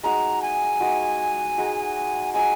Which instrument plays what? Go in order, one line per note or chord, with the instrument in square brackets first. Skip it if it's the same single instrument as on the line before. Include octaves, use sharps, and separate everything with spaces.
[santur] G#3 D#4 F#4 [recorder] A#5
[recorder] G#5
[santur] G#3 D#4 F#4
G#3 D#4 F#4
[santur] G#3 D#4 F#4 [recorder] G#5